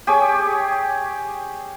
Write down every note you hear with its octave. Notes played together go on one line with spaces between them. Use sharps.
G4 G#4 C#5 D6